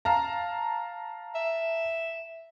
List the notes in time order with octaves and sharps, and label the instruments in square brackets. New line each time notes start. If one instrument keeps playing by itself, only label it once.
[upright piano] F5 A5 A#5
[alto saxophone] E5